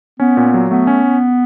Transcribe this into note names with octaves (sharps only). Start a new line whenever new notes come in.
B3 C#4
A#2
F#3
A3 B3
C#4